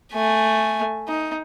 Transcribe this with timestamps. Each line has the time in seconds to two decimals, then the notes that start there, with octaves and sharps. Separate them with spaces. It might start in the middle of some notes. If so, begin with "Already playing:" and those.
0.13 A3 G#5
1.08 D#4